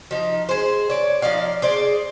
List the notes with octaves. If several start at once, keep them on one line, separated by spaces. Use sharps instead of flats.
F3 D#4
G#4 C5
C#5 D5
F3 D#4 D5 F5
G#4 C5 D5